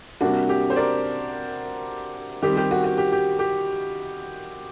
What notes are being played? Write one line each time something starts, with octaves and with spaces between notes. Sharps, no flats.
C3 G3 A#3 D4 F#4
G4
C5
A#4 D5
D#3 G3 C4 G4
G4
F#4
F#4
G4
G4
G4